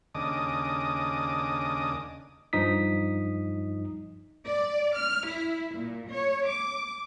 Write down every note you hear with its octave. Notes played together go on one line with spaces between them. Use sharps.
D#2 C#3 D4 D#5 D6 D#6
G2 F3 D#4 D#6 B6
D5
F6
E4
A#2
C#5
D6